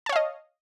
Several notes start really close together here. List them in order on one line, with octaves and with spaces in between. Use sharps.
A5 C#5 F5 D#5